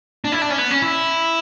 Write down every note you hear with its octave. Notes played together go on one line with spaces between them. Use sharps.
D4
E4
D4
C#4
B3
C#4
E4